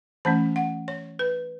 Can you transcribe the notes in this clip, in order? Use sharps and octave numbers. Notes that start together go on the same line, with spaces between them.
E3 A3 C#4 A5
F#5
C#5
B4